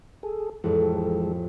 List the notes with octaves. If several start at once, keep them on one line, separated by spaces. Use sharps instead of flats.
G#4 A4
A1 F2 E3 G#3 A4